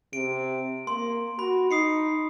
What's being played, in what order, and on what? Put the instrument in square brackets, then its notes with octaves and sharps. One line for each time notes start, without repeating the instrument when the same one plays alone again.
[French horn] C3 [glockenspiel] D7
[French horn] A#3 [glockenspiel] C6
[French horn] F#4 [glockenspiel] B5
[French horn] D#4 [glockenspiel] D#6 C7 C#7